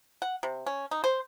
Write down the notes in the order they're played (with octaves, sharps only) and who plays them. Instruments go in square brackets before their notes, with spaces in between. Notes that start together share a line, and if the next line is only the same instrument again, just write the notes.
[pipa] F#5
C3
C#4
D#4
C5